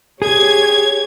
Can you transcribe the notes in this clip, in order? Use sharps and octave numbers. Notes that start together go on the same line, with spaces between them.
G4 G#4 C#5 G#6